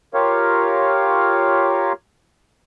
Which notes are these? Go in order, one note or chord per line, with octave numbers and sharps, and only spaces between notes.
F4 G4 A#4 C#5 F5